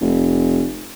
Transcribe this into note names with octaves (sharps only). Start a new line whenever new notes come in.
F1